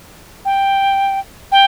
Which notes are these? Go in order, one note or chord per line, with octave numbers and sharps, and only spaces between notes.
G5
G5